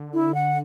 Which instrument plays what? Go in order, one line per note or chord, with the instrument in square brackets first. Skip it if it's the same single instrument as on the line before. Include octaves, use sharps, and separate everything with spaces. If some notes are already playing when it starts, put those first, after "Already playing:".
Already playing: [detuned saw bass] D3
[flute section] E4
F#5